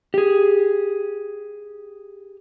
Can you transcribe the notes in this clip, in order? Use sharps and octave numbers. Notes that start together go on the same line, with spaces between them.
G4 G#4